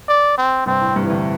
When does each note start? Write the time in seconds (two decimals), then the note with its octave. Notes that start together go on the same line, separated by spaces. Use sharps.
0.08 D5
0.38 C4
0.66 G2 C3 C4
0.81 A2
0.96 G2 C3
1.04 E3
1.10 A2 D3